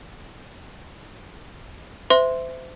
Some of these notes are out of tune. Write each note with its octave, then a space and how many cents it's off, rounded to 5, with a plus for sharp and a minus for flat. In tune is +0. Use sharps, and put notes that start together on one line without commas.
C5 -35 E5 +0 C6 +0